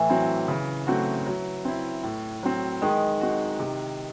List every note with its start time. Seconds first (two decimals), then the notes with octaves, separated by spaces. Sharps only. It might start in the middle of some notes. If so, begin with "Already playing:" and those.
Already playing: A2 E3
0.10 F#3 C4
0.48 C#3
0.87 F#3 A3 C4 F#4
1.26 F#3
1.65 C4 E4
2.03 A2
2.43 F#3 C4
2.81 D#3 G#3
3.21 C4 F#4
3.59 C3